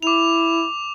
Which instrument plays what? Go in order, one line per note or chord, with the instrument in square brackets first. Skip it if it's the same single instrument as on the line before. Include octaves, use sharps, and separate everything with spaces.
[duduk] E4 [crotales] D6 F7